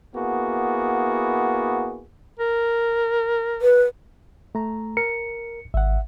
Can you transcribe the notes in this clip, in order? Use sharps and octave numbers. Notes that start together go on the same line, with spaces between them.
A#3 B3 E4 F#4 G#4
A#4
B4
A3 A#5
A#4 C#7
G#1 E5 F#5